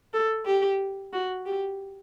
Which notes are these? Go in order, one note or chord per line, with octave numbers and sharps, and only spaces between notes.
A4
G4
F#4
G4